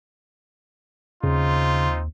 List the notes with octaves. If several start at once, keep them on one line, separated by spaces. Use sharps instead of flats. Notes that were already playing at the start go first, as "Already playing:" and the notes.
D#2 C#3 C4 D#4 F4